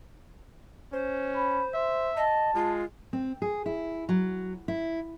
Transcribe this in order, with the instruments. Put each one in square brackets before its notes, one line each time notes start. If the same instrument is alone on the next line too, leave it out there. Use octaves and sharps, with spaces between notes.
[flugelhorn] C#4 [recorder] C5
[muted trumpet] B5
[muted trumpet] C5 [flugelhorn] E5
[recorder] D#5 [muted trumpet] A5
[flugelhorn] G#3 [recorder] F4
[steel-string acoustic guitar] C4
G#4
E4
F#3
E4